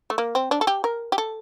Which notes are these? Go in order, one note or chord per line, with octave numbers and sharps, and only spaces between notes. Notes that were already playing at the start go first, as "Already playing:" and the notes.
A3
A#3
C4
D4
A4
G4
A#4
G4
A4